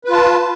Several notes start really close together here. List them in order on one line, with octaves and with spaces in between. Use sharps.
B4 F4 A5